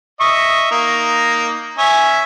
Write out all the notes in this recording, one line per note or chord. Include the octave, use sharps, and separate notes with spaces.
D#5 E5 C#6
A#3 D#4
C#4 E5 G#5